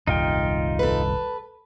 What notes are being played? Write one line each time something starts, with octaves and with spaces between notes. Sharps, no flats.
D#1 C2 F#2 D#4 F4 G5
A4 B4